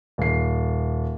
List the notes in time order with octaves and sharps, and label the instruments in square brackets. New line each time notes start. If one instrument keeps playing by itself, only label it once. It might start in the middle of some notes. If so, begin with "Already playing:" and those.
[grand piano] D#1 C7